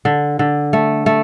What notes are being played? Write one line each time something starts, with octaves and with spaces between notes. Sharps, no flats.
D3
D3
A3
A3